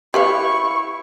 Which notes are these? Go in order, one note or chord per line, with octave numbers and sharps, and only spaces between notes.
E4 G4 B4 F5 C#6